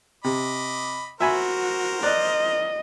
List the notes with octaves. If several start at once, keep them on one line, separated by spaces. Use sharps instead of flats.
C3 D#5 B5 D6
F#4 A#4 C5 E5 G#5 B5
D5 D#5 F#6